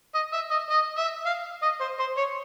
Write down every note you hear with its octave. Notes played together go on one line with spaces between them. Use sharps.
D#5
E5
D#5
D#5
E5
F5
D#5
C5
C5
C#5